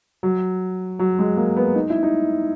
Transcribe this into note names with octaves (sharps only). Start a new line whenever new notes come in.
F#3
F#3
G#3
A#3
B3
D#4
E4
D#4